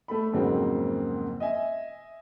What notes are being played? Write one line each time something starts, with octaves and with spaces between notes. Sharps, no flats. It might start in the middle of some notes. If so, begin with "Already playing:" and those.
A3 A4 B5
F2 G#2 C#3 F#3 A#3 C4
D#5 E5 G#5